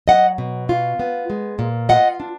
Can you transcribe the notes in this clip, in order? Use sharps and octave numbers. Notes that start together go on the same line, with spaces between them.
F#3 D#5 F#5
B2
F4
B3
G#3
A#2
F4 D#5 F#5
D4